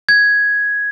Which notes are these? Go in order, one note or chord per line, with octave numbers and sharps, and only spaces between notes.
G#6